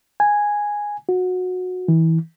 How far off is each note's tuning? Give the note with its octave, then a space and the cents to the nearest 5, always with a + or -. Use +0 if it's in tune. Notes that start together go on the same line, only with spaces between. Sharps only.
G#5 -5
F#4 -20
E3 -25